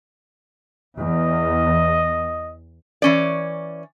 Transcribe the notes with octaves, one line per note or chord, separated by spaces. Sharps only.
E2 D#5
E3 C#4 D5